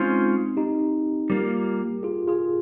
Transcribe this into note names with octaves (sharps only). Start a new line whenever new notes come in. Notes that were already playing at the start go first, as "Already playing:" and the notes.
Already playing: G#3 C4 C#4 D#4 F4 C5
D#4 G4
G3 A#3 F4 G4 A#4
F4 G#4
F4 G#4